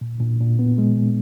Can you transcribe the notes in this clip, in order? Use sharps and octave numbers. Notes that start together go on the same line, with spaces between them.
A#2
A#2
A#2
B3
G#3
A#2